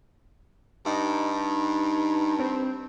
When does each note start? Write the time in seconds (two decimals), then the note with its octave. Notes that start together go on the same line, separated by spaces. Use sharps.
0.86 G2 D#4
2.39 C4